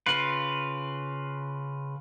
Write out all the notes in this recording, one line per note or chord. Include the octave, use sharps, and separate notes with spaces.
C#3 F4 B4